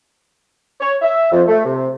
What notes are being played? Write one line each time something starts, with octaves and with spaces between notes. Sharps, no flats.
C#5
E5
F2
A3
C3